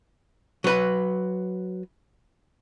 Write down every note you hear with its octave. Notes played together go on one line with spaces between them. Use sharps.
F#3 B4